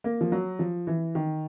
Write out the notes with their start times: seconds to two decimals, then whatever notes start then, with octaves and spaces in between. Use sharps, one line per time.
0.04 A#3
0.21 F3
0.32 F#3
0.59 F3
0.87 E3
1.15 D#3